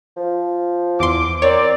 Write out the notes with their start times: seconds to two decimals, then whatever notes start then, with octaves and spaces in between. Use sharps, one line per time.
0.16 F3
1.00 E2 C6 D6
1.42 C4 A#4 C#5 D5